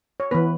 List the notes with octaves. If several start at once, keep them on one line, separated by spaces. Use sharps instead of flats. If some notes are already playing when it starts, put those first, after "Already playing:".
C#5
E3 B3 B4